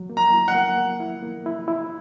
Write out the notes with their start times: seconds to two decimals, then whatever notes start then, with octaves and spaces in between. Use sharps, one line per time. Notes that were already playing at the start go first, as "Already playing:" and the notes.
Already playing: F#3
0.10 A#3
0.17 A#5
0.32 E4
0.48 F#5
0.54 A#3
0.78 A#3
1.00 E4
1.23 A#3
1.46 E4
1.68 E4